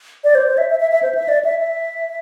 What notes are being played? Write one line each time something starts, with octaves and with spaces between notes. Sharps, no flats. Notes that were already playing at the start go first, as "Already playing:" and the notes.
D5
C5
C5
E5
E5
E5
E5
C5
E5
D5
E5
E5